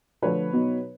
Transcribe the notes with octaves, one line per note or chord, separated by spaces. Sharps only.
D3 F3 A3 B4 C#5
B2 F#3 B3 D#4